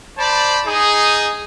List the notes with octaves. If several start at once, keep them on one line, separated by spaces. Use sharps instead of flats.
C5 D5 A5 B5
D#4 G#4